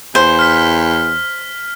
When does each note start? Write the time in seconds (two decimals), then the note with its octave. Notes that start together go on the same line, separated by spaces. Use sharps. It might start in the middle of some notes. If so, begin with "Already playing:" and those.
0.15 E2 C5
0.39 F6 B6